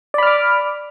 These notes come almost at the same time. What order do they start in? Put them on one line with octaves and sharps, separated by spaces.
D5 B5 F6 D6